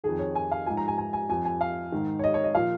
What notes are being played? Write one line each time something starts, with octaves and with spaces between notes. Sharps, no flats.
F2 D#3 G#4
C#5
G#5
F5
G#2 F3 G#5
A#5
G#5
G#5
G#5
F2 F3 G#5
G#5
F5
G#2 D#3
C#5
D#5
C#5
D#5
A#2 F3 F5